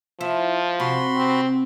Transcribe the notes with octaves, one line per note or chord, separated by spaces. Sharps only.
F3 E4
C3 F#4 B5 C6
C4